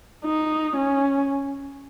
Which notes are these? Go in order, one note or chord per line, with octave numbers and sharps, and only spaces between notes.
D#4
C#4